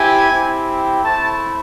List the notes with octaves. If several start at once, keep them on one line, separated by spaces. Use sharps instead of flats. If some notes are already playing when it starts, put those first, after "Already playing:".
Already playing: C4 E4 G4 G#5
C4 E4 G4
A3 C4 E4 A5